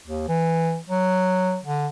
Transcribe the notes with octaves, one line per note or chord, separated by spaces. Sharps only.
D#2
E3
F#3
D3